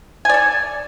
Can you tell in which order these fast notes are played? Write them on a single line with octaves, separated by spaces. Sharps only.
G#5 D5 A4